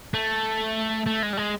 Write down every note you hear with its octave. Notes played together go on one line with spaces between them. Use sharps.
A3
A3
G#3
G3
G#3